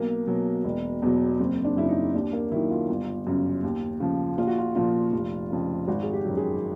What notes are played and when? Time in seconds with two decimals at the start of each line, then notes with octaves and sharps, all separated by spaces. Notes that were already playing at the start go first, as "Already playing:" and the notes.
Already playing: B1 A#3
0.27 B2 F#3
0.65 E1
1.02 E2 B2 F#3
1.39 F#1 C4
1.64 D4
1.77 F#2 C#3 E4
1.89 D#4
2.14 D#2 D4
2.33 A#3
2.52 D#3 F#3 E4
2.71 F4
2.89 G1
3.27 F#2 C#3
3.63 D#2
4.00 C#3 F3
4.38 A#1 F4
4.47 F#4
4.59 F4
4.75 A#2 F3 F4
5.12 F1
5.50 F2 C#3
5.88 G#1 F#4
6.03 G#4
6.13 G4
6.25 F#2 D#3 F#3
6.37 G#4